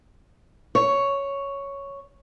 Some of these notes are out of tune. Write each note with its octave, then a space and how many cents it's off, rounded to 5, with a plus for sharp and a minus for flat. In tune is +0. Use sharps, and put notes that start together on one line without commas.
C#5 +5